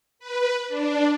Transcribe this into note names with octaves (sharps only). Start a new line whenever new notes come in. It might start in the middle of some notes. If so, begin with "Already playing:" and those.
B4
D4